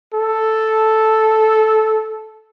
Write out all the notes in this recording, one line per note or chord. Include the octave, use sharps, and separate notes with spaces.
A4